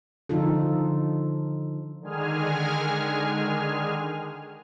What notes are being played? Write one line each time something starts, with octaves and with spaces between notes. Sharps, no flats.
D3 F3 D#4 F4 A4
D3 D#3 G#3 G#4 G#5 F6